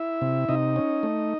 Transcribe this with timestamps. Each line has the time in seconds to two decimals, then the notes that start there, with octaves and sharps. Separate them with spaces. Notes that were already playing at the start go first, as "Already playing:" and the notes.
Already playing: E4 E5
0.21 C3
0.49 C3 D#4 D#5
0.76 C#4
1.03 A3